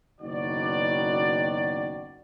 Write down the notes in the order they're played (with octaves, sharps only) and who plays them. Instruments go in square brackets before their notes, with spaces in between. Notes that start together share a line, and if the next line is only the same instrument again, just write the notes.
[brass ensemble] F#1 B2 D#3 F#4 D5